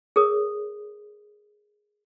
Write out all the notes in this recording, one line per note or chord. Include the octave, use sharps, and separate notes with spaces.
G#4 A#4 C#5 D#6